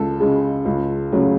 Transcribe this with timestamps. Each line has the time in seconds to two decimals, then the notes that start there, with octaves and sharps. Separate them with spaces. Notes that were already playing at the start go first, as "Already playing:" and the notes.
Already playing: C#2 A4
0.20 C#3 G#3
0.65 C#2
1.12 C#3 F#3 A3